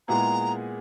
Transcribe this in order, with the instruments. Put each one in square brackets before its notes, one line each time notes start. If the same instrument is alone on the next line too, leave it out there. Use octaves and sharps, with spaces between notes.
[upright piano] A#2 G#3 B3 E4 G#4 [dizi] A#5